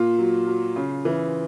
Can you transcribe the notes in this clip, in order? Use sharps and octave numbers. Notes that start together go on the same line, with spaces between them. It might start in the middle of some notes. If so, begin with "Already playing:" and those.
Already playing: A#2 F4
F#3
F#3
C#3
E3